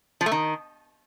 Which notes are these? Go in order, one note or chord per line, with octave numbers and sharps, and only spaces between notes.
F3
A3
D#3